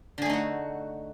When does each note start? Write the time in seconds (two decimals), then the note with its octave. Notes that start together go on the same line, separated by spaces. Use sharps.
0.18 D3
0.22 G#4
0.26 A3
0.30 D#4
0.33 F#4